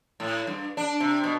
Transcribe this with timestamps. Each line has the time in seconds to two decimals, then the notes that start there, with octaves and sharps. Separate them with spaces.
0.20 A2
0.47 G2
0.77 D4
1.00 C3
1.24 B2